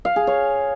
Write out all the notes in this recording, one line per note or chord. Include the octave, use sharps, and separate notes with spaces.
F5
G#4
C#5